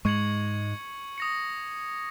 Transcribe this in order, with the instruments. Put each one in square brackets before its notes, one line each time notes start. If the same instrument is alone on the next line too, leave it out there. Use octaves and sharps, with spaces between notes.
[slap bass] G#2 G#3 [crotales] C#6 G#6 C#7 F#7
[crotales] D#6 A#6 C#7